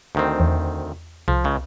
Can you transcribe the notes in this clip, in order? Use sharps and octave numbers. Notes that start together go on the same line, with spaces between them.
D2 D#3 C4
E2
C2 F3
C#2 C#3